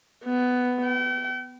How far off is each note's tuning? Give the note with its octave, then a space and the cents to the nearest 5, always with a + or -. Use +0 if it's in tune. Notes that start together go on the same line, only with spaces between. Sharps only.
B3 +10
G5 -40